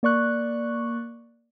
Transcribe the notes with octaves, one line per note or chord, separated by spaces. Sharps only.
A#3 D5 C#6 F#6